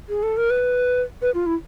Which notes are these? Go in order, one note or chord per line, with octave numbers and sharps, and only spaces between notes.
G#4
A4
A#4
B4
B4
F4
E4